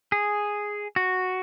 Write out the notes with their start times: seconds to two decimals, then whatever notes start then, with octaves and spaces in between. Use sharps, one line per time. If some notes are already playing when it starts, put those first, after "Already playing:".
0.12 G#4
0.96 F#4